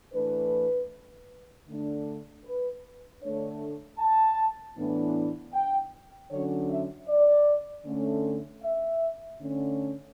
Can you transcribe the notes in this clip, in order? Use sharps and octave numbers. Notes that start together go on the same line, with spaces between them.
A2 E3 A3 D4 B4
D3 A3 D4
B4
D3 A3 D4 C#5
A5
A2 E3 B3 D4
G5
D3 F#3 C#4 C#5
E5
D5
D3 A3 C#4
E5
D3 A3 C#4